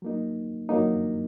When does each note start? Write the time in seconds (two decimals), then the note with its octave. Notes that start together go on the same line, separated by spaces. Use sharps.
0.02 F#3 A#3 D#4
0.69 F#3 A#3 D#4